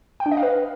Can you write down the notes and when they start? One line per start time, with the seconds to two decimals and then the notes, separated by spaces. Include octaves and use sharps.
0.20 G5
0.26 D4
0.31 D#5
0.37 F5
0.43 B4